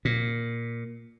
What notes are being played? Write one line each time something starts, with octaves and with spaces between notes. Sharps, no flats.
A#2